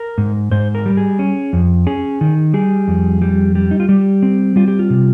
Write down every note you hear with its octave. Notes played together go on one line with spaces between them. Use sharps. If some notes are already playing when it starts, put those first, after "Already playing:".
Already playing: A#4
G#2
G#2 C5
A#4
G3
G#4
C#4
F2
C#4 G#4
D#3
G3 G#4
F2
G3
G3
D#4
F4
G3 G4
C4
G3 F4
G4
F4
C3